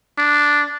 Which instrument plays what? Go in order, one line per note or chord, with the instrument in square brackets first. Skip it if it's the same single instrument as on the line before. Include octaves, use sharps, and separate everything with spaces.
[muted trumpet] D4